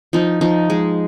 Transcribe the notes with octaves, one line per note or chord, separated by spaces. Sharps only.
F3 D#4
F3 D#4
G#3